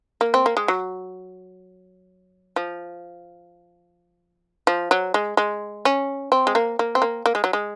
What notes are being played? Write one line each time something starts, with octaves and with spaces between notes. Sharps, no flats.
A#3
C4
A#3
G#3
F#3
F3
F3
F#3
G#3
G#3
C#4
C4
G#3
A#3
A#3
C4
A#3
A#3
G#3
F#3
G#3